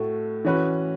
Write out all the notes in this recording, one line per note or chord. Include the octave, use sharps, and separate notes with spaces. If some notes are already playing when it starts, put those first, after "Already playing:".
Already playing: A2 A3 F#4 A4
E3 C#4 F#4 B4